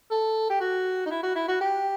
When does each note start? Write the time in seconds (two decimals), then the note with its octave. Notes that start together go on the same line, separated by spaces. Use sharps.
0.11 A4
0.50 G4
0.60 F#4
1.06 D#4
1.11 E4
1.23 F#4
1.36 E4
1.48 F#4
1.61 G4